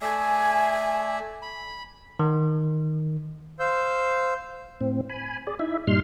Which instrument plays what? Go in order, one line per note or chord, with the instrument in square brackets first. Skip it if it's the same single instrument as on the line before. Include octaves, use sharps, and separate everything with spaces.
[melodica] A3 D5 E5 [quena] G#5
[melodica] B5
[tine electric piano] D#3
[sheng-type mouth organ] C5 F5 E6 G6
[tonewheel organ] A2 C4
G#5 B5
G#4 D5
D#4 E4 E5
G2 A#2 G3 D#4 C6 F6